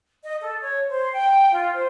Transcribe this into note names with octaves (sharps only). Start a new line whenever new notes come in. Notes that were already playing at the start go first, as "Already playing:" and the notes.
D#5
A4
C#5
C5
G5
F4
C5